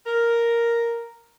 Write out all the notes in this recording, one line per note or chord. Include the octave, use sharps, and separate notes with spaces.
A#4